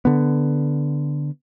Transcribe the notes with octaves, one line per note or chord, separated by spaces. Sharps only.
D3 B3